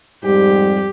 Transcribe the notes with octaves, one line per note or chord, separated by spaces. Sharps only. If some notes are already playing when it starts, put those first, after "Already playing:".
F2 G#2 G3 G4